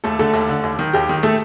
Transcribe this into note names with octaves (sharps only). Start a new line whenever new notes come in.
D#2 A3 A4
D3 A3 A4
D#2
D3
D#2
D#3
D#2 G4
D#3
A3 A4